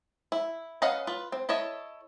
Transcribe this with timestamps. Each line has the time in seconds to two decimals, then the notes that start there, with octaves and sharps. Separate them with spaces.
0.32 E4
0.82 C#4 B4 D#5 F5 F#5
1.07 F4 B4
1.32 C4
1.49 E4 A4 C#5 D#5